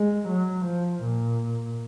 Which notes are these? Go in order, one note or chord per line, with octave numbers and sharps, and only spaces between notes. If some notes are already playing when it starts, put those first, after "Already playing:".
Already playing: G#3
F#3
F3
A#2